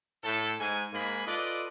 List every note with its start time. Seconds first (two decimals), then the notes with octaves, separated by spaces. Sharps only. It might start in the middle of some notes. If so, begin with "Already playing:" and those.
0.24 A2 A3 A4
0.60 G#2 G#5
0.94 G#2 A#3 G#4 B5
1.27 F4 A4 B4 D5 D#5